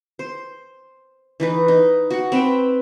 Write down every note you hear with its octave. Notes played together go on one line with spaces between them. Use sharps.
C5
E3 D#4 B4
D#4
F#4 F#5
C4 B4 E5 G5